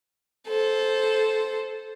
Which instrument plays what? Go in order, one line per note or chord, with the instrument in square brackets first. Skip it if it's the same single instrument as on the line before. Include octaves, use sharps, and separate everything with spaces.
[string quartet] A4 C5